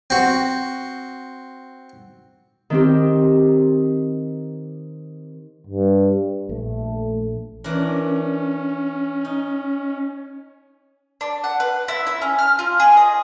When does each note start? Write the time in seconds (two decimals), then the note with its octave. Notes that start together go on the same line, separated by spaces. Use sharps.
0.10 C4 F#4
2.70 D#3 C4 G4
5.67 G2
6.49 A#1 A3
7.64 E3 C#4 D4 A#4
9.25 D#4
11.21 D4
11.44 F#5
11.60 B4
11.88 E4
12.07 E4
12.22 C#4
12.38 F6
12.59 F4
12.80 G#4
12.97 D#5